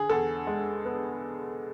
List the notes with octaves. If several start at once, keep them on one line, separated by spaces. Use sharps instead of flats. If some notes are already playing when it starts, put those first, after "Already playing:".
Already playing: D3 G#4
E2 A4
G#3
B3